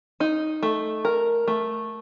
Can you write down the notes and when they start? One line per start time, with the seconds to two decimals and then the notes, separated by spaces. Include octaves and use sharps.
0.20 D#4
0.63 A3
1.05 A#4
1.48 A3